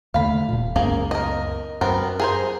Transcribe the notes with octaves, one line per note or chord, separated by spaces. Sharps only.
D#2 D3 A3 F5 B5
D#1 A#2
C#2 F#2 A#3 B3 G#4 A#4
A#4 D#5
F#2 B3 C4 A#4
G#4 A#4 C5